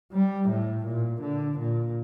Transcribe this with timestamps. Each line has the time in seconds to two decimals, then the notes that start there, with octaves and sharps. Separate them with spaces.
0.12 G3
0.49 A2
0.85 A#2
1.22 D3
1.58 A#2